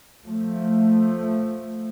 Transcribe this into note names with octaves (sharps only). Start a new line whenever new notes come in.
F3 A3